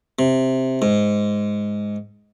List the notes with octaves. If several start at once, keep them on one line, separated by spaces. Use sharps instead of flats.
C3
G#2